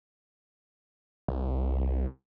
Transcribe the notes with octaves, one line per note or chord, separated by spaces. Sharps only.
C2